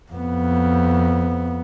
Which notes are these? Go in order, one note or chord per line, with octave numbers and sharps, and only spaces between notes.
F2 B3